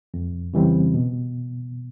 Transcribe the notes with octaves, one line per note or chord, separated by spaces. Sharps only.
F2
C#3 E3 G3 C4
B2